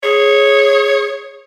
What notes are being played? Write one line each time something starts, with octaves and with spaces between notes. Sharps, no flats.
G#4 C#5